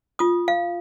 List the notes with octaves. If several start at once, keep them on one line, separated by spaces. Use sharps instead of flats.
F4 D#6
F5